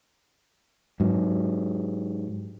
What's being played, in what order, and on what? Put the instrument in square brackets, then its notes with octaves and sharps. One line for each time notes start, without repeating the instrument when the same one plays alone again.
[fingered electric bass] G#2 F#3